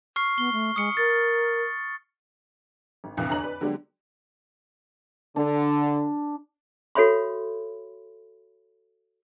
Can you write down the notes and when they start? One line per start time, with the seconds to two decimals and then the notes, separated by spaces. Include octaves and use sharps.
0.16 C#6 F6 C7
0.38 B3 G7
0.53 A3
0.76 G#3 D#6 C#7
0.97 A#4 A6
3.04 G#1
3.17 C2 F2 D3 E3 F5 F#6
3.29 E2 D3 C#5 D#5 A#5 F#7
3.42 B4 D5
3.61 D3 F#3 G#3 B3 D4 G4
5.36 D3 D4
6.95 F#4 A4 C#5 E5 B5 C6